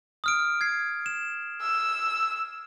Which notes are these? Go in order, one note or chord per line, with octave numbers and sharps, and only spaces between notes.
D#6 F6 D7
G#6 C7
E7
E6